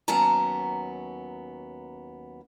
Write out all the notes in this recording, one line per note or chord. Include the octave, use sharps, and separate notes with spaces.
D#2 F#3 B3 C#4 A5 A#5